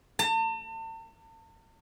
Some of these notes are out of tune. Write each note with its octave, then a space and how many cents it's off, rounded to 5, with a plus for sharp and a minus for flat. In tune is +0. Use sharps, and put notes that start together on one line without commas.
A5 +40